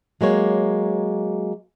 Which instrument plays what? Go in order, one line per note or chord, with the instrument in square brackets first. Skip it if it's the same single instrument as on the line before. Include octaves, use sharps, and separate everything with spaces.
[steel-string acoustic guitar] F#3 G#3 A#3 C#5